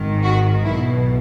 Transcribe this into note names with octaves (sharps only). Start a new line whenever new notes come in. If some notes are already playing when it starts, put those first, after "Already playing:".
Already playing: G#1 G#2 D#3
F#4
B1 B2 E4